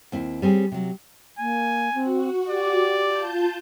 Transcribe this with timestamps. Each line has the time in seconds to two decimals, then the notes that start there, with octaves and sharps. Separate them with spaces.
0.12 D#2 C4 E4
0.42 G3 C4 C#4 G#4
0.72 C3 F#3
1.39 A#3 G#5
1.94 C4 F#4
2.49 G4 D5
3.03 F4 A5 G6